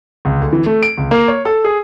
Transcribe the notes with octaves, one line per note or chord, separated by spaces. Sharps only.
C#2
D2
E3
A3
D7
C#2
A#3
C#5
A4
G#4